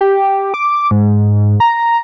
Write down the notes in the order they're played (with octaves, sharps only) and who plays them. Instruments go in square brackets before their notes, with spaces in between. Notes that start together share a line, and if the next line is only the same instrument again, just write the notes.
[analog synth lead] G4
D6
G#2
A#5